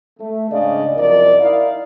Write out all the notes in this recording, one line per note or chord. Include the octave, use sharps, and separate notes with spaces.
A3
G#2 C#3 D4 D5 D#5 F5
C2 F#2 F3 A#4 D5 D#5
D#4 E4 A#4 D5 F5